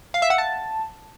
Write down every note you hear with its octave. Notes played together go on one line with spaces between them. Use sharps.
F5
E5
F#5
A5